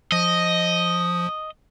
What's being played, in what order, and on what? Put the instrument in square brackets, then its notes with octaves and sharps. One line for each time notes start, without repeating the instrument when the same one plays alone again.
[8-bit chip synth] F3 [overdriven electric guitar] D#5